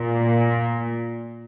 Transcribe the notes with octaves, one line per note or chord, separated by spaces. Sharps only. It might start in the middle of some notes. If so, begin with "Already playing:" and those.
Already playing: A#2